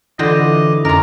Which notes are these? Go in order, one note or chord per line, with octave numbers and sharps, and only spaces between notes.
D3 E3 E4 F4 C5 D#5 D6
F2 C#4 F4 A#4 D#5 A#5 D6